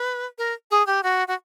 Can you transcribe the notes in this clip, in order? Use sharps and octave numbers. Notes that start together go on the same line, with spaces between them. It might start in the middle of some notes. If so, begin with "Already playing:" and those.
Already playing: B4
A#4
G#4
G4
F#4
F#4